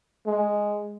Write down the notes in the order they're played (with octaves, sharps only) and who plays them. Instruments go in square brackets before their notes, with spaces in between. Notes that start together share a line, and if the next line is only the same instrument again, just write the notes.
[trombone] G#3